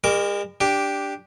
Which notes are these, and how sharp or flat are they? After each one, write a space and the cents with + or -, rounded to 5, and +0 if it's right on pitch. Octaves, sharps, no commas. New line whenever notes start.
G#3 -45 A#4 +0 D6 -30
D4 -5 G4 +0